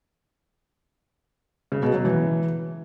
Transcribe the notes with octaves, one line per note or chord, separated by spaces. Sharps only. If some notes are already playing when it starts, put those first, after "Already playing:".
C#3
B2
F#3
E3